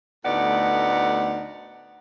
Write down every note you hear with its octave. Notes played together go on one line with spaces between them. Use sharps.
D2 A2 B3 D#4 D5 F#5